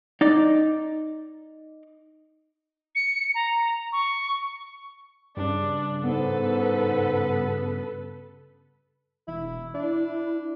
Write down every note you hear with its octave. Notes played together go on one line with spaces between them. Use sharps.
D#4 D5
C#7
A#5
C#6
G2 C#3 D4
G#2 B3 A4 B4
E1 E4
D4 E4